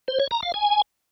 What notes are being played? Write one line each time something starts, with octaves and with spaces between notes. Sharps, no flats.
C5
C#5
A#5
F5
G#5